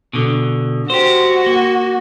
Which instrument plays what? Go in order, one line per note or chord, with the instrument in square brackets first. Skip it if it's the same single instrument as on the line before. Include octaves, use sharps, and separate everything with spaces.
[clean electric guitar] B2 D3
[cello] F#4 [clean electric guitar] G4 C5
[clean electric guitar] A#3